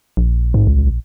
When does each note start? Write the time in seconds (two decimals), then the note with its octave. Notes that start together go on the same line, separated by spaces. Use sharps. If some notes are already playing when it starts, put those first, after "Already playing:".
0.17 A#1
0.54 G#2
0.67 C#2